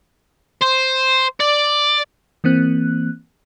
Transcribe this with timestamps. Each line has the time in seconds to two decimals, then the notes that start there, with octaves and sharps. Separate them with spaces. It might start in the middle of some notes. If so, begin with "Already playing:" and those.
0.62 C5
1.40 D5
2.44 E3 A#3 C4 F#6